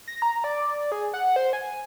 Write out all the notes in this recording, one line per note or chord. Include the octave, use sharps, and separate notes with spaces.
A#6
A#5
D5
G#4
F#5
C5
G#5